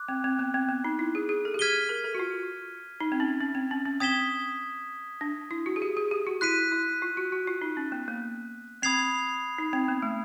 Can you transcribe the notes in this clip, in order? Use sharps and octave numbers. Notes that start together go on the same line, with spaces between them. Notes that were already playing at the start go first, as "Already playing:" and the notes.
Already playing: D6 F#6
C4
C4
B3
C4
B3
D#4
E4
G#4
G#4
A4
G4
G#4 F6 G#6 B6 D#7 G7
A#4
A4
F#4
F4
D#4
C4
C#4
C#4
C4
C#4
C#4
C4 D#6 G#6 B6 E7 G7
D4
E4
F#4
G#4
G4
G#4
G4
F#4
E4 F#6 B6 D#7
E4
F4
F#4
F#4
F4
D#4
C#4
B3
A#3
C4 B5 D#6 G#6 C7 F7
D#4
C4
B3
A3